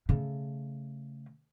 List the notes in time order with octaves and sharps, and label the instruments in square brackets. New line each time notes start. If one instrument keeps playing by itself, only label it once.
[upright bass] C#3 A3